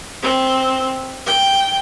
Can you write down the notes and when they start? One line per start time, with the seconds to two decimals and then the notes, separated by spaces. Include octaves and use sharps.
0.22 C4
1.27 G5